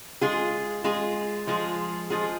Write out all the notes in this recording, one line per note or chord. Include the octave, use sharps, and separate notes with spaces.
G#3 F4 G#4
G#3 F4 G#4
F3 G#3 F4 G#4
F3 G#3 F4 G#4